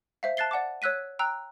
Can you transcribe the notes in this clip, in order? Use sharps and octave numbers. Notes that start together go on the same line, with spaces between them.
C5 E5 F5
A5 F#6 A6 C7 G7
D5 F#5 A5 D6
C#5 E6 F#6 B6 D#7
G5 A#5 E6 F#6